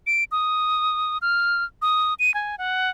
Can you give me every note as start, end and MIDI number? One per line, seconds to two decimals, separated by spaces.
0.07 0.24 98
0.32 1.18 87
1.22 1.64 89
1.82 2.14 87
2.19 2.33 99
2.34 2.56 80
2.58 2.90 78